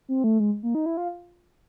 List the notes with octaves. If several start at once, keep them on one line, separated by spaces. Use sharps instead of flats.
C4
A3
G#3
A#3
D#4
E4
F4